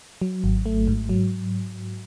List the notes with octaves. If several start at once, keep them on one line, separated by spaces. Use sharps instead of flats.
F#3
G#1
A3
G#2
F#3